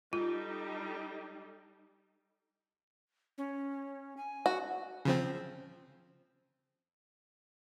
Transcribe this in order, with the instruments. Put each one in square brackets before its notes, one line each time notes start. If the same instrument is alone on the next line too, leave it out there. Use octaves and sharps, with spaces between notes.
[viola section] G3 D#4 A4 [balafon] F4
[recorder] C#4
G#5
[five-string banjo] F#4
[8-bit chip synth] C#3 F3 C4